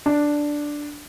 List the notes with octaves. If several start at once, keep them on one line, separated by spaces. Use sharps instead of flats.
D4